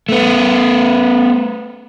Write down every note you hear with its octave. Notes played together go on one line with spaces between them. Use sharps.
A3 B3